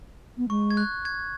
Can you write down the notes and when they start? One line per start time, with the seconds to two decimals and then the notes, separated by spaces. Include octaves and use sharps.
0.38 B3
0.49 G#3 C#6
0.71 G#6
0.77 F#6
1.05 G#6